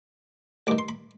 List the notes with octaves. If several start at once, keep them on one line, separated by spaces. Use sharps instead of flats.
A1 G2 D#3 D6
C6
B5